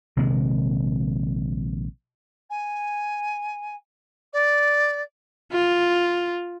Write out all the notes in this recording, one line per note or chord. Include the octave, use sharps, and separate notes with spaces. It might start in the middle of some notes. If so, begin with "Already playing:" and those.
A#1 C3 D#3 G#3
G#5
D5
F4